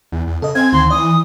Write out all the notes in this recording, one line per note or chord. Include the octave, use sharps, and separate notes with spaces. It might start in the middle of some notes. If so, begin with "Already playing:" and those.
E2
E2
C#3 A4 D#5
C4 F5 G#5 G#6
D2 D#3 C6
E3 D5 D#6